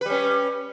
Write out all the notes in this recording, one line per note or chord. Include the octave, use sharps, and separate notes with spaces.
G3 C#4 B4